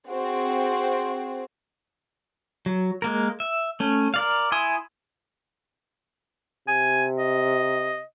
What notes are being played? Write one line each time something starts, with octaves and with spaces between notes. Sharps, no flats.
C4 F#4 G#4
F#3
G#3 A#3 A#4
E5
A3 C#4
A#4 D5 F5
E4 G#5 C6 D#6
C3 G#5
D#5